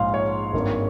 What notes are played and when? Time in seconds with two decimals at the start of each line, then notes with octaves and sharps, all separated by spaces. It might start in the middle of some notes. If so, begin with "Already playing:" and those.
Already playing: A#1 G#2 F3 G#3 F5 C6
0.14 C#5
0.53 G#1 G2 D#3 A#3